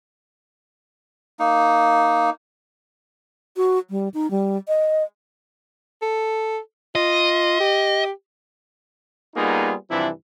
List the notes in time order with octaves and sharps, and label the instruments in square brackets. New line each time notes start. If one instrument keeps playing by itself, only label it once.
[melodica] A#3 D#4
[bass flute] F#4
G3
D#4
G3
D#5
[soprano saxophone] A4
[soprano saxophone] F4 [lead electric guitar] D#5
[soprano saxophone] G4
[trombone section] G3 A#3 B3 D#4 F4 G#4
G2 C3 E3 F3 D4 E4